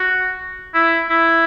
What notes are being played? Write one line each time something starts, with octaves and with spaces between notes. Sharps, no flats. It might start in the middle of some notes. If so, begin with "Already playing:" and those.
Already playing: F#4
E4
E4